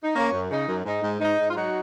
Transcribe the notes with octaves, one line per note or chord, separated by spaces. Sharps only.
D#4
A#3 C#4
F#2
C#3 D#4
F#2
G#2 D#4
G#2
G#2 D#4
G#2
F4
F#3 D#4 F#4